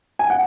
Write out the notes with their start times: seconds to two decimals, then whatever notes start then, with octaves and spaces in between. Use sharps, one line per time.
0.19 G#5
0.30 F#5